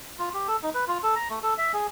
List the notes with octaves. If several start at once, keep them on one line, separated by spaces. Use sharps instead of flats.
F4
G4
A4
D#4
B4
F4
A4
A#5
A3
A4
E5
G#4